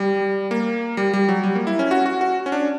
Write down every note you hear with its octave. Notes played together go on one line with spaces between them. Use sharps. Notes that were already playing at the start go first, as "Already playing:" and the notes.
Already playing: G3
A#3
G3
G3
F#3
G3
A#3
E4
C#4
F#4
F#4
F#4
C#4
D4